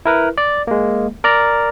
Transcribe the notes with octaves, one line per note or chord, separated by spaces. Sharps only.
E4 A#4 B4
D5
G#3 A#3
A#4 D5 A#5